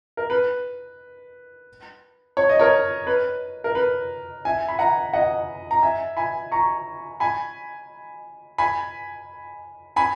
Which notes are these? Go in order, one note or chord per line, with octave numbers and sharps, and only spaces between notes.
A#4
B4
C#5
D#5
A#4 C#5
B4
A#4
B4
E5 G#5
B5
F#5 A#5
D#5 F#5
A#5
E5 G#5
G#5 B5
A#5 C#6
G#5 B5
G#5 B5
G#5 B5